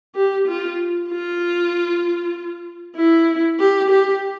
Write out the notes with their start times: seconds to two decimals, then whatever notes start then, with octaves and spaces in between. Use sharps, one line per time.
0.16 G4
0.48 F4
1.09 F4
2.96 E4
3.59 G4
3.90 G4